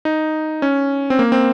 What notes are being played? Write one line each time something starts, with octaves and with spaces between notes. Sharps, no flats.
D#4
C#4
C4
A#3
C4